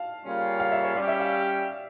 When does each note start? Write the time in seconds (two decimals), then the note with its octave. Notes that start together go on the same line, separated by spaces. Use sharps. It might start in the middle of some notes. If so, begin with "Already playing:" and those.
Already playing: F5 A5
0.24 C#3 G3 A#3 C#4 F4
0.60 F5
0.72 E5
0.84 C#5
0.96 G3 C#4 G4 D5
1.08 E5
1.20 F5